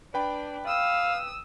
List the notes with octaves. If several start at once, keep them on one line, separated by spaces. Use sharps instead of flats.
D4 B4 G5 B5
F5 D#6 E6